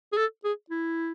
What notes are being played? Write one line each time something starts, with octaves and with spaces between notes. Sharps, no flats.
G#4
A4
G#4
E4